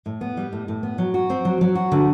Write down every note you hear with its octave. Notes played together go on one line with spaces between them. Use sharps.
A2
B3
G3
A2
A2
B3
F#3
F#4
C4
F#3
F#3
F#4
D3